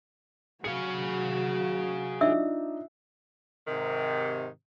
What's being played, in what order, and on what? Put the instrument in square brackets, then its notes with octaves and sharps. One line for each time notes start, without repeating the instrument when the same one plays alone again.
[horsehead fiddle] F#3 F#4 [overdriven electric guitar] G#4 F5 [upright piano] C#7
[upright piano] D4 D#4 F4 [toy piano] E5 E6
[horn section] G#2 C3 D#3